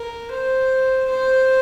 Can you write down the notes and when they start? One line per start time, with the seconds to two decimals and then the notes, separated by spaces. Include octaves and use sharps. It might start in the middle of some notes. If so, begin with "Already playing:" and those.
Already playing: A#4
0.32 C5
1.09 C5